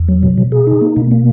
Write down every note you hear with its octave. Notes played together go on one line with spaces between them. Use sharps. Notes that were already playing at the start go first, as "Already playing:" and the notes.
Already playing: E2
F#3
B2
B2
G#4
D#4
A#3
B2
A#3